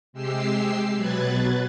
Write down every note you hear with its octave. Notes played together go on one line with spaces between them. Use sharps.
C3 G#3 G4 E6 C7
B2 F#3 B4 F#6 G#6 A6